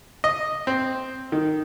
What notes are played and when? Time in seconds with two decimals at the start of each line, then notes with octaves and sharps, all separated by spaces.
0.24 D#5
0.67 C4
1.32 D#3